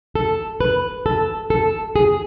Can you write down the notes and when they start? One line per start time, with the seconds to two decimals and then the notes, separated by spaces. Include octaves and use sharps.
0.15 A4
0.61 B4
1.06 A4
1.50 A4
1.96 G#4